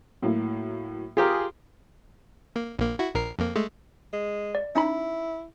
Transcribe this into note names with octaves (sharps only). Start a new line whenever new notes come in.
A2 F#3 A#3
F4 G4 G#4 A#4
A#3
A#1 A#3
E4 F#4
A#1 A#4 C7
F2 A#3
G#3 A3
G#3
D5
C#4 D#4 E4 B5